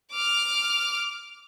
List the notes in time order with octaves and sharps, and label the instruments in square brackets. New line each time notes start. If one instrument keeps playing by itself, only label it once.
[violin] D6 F6